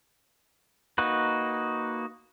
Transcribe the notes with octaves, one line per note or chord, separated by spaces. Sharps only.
A#3 D#4 F#4 B4